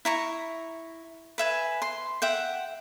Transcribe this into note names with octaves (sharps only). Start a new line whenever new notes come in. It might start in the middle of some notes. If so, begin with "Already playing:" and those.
E4 A#5 C#6
B4 E5 G#5
C6
E5 F#5 G5